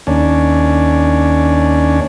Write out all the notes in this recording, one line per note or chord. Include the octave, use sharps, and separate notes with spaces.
D#2 C#4 D4